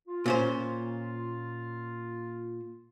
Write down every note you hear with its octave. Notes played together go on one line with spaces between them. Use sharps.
F4
A#2 C#4 C5